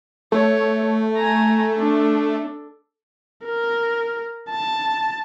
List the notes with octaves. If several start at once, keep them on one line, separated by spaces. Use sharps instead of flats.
A3 C#5
G#5 A#5
D4 A4
A#4
A5